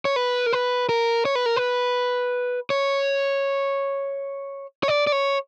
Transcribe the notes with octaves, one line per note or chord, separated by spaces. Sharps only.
C#5
B4
A#4
B4
A#4
C#5
B4
A#4
B4
C#5
C#5
D5
D5
C#5